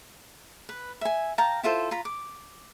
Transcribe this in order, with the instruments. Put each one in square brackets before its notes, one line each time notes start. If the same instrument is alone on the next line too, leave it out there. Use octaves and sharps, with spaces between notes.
[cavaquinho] B4
E5 G#5
F5 G5 A5 A#5
E4 F4 A4 C5
F4 A#5 B5
D6